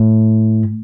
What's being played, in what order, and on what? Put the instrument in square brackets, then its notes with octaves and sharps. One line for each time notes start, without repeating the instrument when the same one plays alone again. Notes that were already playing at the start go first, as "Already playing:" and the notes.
Already playing: [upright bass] A2